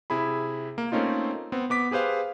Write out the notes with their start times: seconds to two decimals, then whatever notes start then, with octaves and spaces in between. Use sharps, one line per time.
0.10 C3 E4 G#4 B5
0.78 A#3
0.92 A3 A#3 C4 C#4 D#4 F4
1.52 B3 C4
1.70 B3 D6 B6
1.91 G4 G#4 B4 C5 F5